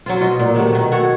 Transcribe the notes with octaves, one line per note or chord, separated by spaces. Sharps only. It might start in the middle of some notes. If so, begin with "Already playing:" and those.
F#3 C4 F4
B2 F4 D#5
A#2
C3 D#3 F#3 A3
B2 D#3
F#4 A4 C#5